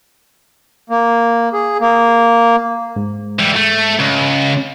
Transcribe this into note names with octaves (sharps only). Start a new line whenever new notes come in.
A#3
G#4
A#3
G#2
E3 G3
A3
C#2